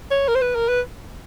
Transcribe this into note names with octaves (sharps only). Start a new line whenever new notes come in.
C#5
A#4
C5
B4
A#4
B4